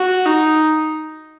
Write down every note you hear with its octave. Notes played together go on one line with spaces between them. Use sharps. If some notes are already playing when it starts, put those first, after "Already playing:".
Already playing: F#4
D#4